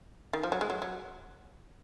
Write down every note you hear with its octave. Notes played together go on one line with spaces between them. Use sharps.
D#3
F3
F#3
G#3
F#3
F#3